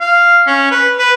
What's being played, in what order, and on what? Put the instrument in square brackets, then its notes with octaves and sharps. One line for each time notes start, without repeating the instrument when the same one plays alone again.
[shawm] F5
C#4
B4
B4